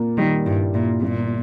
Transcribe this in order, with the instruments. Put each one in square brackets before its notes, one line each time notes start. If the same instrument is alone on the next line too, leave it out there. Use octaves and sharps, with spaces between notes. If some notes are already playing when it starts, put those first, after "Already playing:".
Already playing: [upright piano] A#2 A#3
[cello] D#3 [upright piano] G3
[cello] G2 [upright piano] E4
[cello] A#2 [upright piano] E4
[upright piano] G1 [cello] A#2